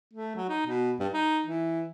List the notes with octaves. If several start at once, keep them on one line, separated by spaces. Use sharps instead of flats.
A3
F#3
D#4
B2
G2
D#4
E3